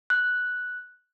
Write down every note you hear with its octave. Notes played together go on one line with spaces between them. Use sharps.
F#6